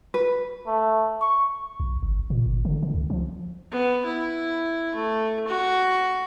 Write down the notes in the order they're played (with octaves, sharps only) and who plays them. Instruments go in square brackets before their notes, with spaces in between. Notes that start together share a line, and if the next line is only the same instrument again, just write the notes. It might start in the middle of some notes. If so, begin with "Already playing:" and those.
[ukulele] B4
[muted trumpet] A3
C#6
[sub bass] B1
G1
A#2
G1
D3
D3
C#2
F3
[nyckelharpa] B3
E4
A3
F#4